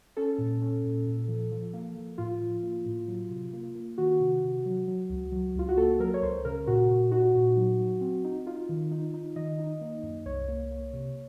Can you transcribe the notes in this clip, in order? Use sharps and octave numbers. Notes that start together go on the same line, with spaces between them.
C#4 A4
A#2
C#4
A#2
A#2
F3
F3
A#3
F3
A2 F4
F3
A#3
A2
F#3
C3
A#3
A#3
D#3 F#4
C3
C3
F#3
F#3
C#2
F#3
C#2 F4
F#4
A#3 A4
F#3 A#4
C#5
C#2 C5
C#3 A#4
A#2 F#4
A#2
D#4 F#4
A#2
F#3
F#3
C4
D#4
D#4 F4
D#3
D#4
D#4
D#3 D#5
D#4
A#3
F#2
C2 C#5
A#3
A#3
C3